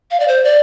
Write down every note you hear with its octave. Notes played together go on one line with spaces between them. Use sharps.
F5
D5
C5
D5